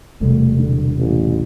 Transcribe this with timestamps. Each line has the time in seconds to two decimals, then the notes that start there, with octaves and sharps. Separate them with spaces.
0.21 E1 C2 A3
0.59 D3
0.98 A1